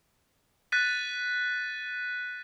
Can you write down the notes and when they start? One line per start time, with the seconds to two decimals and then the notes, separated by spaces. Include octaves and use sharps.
0.72 F#6 A6 B6 D#7